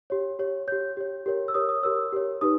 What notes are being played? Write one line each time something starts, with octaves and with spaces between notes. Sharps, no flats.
G4 C#5
G4 C#5
G4 C#5 G6
G4 C#5
G4 A#4 C#5
E6
G4 A#4 C#5 D#6
D#6
G4 A#4 C#5 E6
G4 A#4 C#5
D#4 G4 B4 D#6